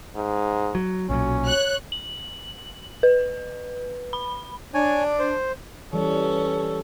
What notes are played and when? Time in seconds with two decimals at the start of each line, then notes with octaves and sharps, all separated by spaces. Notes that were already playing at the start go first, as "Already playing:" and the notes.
0.16 G#2
0.75 F#3
1.10 B1 A#2 F#3 C#4
1.46 C#5 F#6
1.92 F#7
3.03 B4
4.13 B5
4.74 D4 C#5 G#5
5.19 C5
5.93 E3 G3 C#4 A4